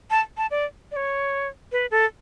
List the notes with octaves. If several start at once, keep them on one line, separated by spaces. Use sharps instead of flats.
A5
A5
D5
D5
C#5
B4
A4